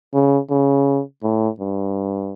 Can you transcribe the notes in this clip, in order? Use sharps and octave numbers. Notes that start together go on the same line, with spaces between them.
C#3
C#3
A2
G2